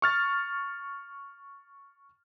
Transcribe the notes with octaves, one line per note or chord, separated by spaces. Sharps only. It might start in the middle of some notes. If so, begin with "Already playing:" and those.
C#6 F6 A6